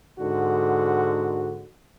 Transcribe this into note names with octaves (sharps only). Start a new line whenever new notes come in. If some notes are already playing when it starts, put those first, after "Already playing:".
G#2 D3 F#4